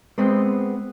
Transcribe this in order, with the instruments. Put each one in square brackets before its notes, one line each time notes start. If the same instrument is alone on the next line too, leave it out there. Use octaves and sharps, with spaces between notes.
[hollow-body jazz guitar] G#3 B3 C4